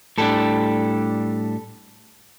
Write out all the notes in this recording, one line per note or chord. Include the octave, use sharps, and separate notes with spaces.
A2 G3 D4 A4